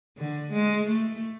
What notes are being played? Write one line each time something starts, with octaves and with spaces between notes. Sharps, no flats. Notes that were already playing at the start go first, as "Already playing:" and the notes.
D3
G#3
A3